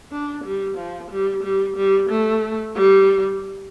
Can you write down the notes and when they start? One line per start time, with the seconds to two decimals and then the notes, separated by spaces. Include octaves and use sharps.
0.11 D4
0.44 G3
0.77 F3
1.11 G3
1.43 G3
1.76 G3
2.09 A3
2.75 G3